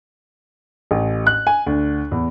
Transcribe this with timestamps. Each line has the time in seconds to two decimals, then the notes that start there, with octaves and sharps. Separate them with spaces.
0.91 A1
1.27 F#6
1.47 G#5
1.66 D2
2.11 E2